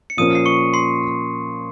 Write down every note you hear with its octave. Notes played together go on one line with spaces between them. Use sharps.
C#7
A#2 F3 A#3 C#4 D#6 D#7
C7
C#6 C#7
C6 C7